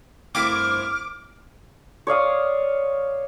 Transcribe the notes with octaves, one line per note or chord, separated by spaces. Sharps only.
G1 A3 A#3 C4 E4 D6 F6 G#6
C#5 D5 F5 D#6